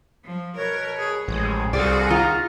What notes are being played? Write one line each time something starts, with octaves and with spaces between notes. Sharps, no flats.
F3
B2 A#4 B4 C#5
G#4
A1 F3 G#3 G#4
C2 F#4 G#4 A4 C5 D5 F5
D#3 F4 A#5